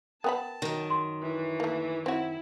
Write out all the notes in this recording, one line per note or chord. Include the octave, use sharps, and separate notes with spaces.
B3 A#4 B4 G5 A5 B5
F#2 D#3
C6
E3
A3 A#3
C4 E4 F#4